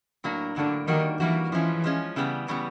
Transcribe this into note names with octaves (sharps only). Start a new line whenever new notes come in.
A2 F#3 A#3 D4
A2 D3 F#3 A#3 D4
D#3 G3 A#3 D4 F#4
E3 G3 A#3 D4 F#4
E3 F3 G#3 C#4 F4
F3 G#3 C#4 F4
C#3 E3 G3 B3
C#3 E3 G3 B3